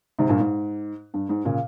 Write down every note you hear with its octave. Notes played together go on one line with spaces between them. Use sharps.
G#2 C3
G2 A#2
G#2
G2
G#2
A#2 C#3